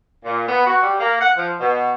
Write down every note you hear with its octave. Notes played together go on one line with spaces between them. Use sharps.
A#2
B3
F#4
G3
A#3
F#5
F3
B2